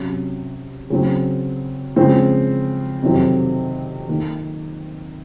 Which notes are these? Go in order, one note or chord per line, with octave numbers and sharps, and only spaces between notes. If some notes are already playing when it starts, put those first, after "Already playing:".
Already playing: C3 F#3 C#4
C#3 F#3 C4
C#3 F3 G#3 C4
F2 C3 D#3 F#3 C4
D#3 A#3 D#4